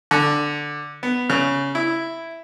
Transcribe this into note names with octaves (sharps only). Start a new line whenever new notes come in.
D3
B3
C#3
E4